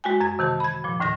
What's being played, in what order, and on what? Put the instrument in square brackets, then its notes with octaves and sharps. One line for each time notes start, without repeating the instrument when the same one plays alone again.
[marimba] G#3 F#4 G5 G#5
F#2 G#6
C3 D#3 E3 A5
B5 G#6
A#2 F3
D#2 A2 D3 D#3 A#6